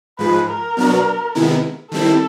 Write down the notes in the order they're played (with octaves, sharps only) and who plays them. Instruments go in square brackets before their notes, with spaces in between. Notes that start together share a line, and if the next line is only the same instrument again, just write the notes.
[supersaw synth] G#2 F3 G#3 [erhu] B4
[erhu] A#4
[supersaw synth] B2 F#3 B3 D4 F#4
C3 D#3 G#3 B3 E4
[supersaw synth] D#3 G3 C4 E4 [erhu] A4